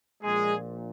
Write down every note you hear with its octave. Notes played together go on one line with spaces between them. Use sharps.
A#1 A#2 G#3 G#4